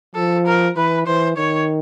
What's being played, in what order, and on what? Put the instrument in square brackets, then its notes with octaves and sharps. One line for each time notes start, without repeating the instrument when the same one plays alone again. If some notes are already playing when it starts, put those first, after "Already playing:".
[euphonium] F3 [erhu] A4
[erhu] A#4
[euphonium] E3 [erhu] B4
[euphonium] E3 [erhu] C5
[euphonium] D#3 [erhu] C#5